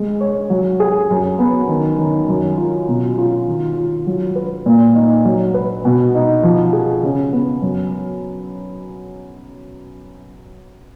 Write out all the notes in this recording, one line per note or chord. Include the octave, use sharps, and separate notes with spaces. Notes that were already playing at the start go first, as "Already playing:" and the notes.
Already playing: G#3
C#5
F#3
G#4
F#2
B3
D#3
D#3
F#2
F4
B2
F4
D#3
F4
F#3
B4
A#2
D#4
F#3
B4
B2
D#4
F3
G#4
C#3
B3
F#2